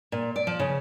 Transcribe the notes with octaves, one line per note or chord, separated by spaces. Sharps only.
A#2
D5
F3
C#3